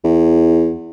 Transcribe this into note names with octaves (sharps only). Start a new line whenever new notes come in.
E2